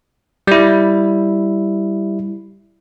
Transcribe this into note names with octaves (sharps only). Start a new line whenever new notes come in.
G3 E4